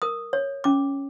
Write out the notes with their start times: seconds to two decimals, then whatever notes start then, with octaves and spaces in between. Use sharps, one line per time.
0.02 A#4 D#6
0.33 C#5
0.64 C#4 D6